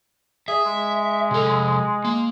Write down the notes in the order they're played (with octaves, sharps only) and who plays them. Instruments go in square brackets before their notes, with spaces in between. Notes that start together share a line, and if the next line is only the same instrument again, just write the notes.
[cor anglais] G#4 [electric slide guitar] E5
[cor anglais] G#3
[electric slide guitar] C3 A4
A#3